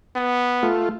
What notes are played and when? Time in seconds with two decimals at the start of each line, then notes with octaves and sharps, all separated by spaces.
0.16 B3
0.63 A3 F4